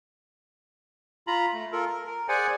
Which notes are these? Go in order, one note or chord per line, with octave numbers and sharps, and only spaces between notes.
F4 A#5 B5
A3
F4 A4 A#4
A#4
A#4
G#4 C5 D5 F#5 G#5